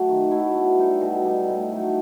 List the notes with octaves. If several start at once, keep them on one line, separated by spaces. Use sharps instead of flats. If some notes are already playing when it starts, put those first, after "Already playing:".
Already playing: F#3 A3
D#3
F#3 A3 E4
B2
G3 D#4 A4
B2
G3 D#4 A4
A2
F#3 A3 D#4